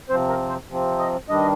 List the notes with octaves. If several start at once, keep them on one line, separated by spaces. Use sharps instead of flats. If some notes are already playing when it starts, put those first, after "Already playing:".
C3 F3 C4 C5
A#4
C5
C3 F3 C4
D#5
G2 D#3 G3 D4 D#5